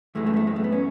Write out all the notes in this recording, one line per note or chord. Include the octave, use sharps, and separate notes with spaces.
F#2 E3 G#3 A3
A3
B3
A3
G#3
A3
B3
C#4